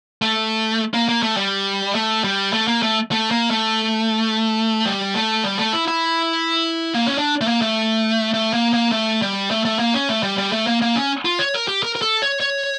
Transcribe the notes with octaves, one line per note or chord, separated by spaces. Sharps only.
A3
A#3
A#3
A3
G3
A3
G3
A3
A#3
A3
A3
A#3
A3
G3
A3
G3
A3
E4
E4
A#3
C#4
D4
A3
A#3
A3
A3
A#3
A#3
A3
G3
A3
A3
A#3
C#4
A3
G3
G3
A3
A#3
A#3
C#4
F4
C#5
A#4
G4
A#4
A#4
A4
C#5
C#5